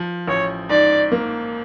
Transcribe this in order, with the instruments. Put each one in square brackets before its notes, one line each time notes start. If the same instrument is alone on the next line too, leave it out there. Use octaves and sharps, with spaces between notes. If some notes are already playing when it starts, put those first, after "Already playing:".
Already playing: [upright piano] F3
[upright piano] A1 [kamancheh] C#5
[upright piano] G#2 [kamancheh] D5
[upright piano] A#3